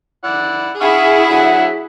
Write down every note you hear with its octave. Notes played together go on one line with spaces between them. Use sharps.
E4 D5 F#5
E4 G#4 E5 F#5 C#6 F6
D3 F#3 F#5